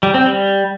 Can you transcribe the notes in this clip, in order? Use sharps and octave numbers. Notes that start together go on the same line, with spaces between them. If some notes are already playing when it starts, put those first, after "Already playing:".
G3
C4
G3